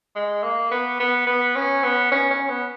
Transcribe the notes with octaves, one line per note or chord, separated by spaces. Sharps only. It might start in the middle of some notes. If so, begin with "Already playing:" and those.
G#3
A#3
B3
B3
B3
C#4
B3
C#4
C#4
B3